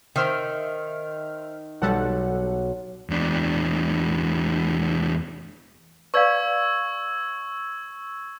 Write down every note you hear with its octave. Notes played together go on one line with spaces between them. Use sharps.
D#3 C5 E5 F6
B1 G3 A4 F#5
E2 D4
B4 D5 F5 C#6 E6 G#6